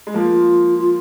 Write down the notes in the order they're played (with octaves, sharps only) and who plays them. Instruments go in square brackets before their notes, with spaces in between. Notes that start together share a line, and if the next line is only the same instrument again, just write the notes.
[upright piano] G#3
[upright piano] F3 A#3 [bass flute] F4
[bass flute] F4